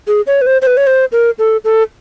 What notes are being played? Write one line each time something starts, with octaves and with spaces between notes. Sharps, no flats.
G#4
C#5
B4
C5
C5
B4
C#5
C5
A#4
A4
A4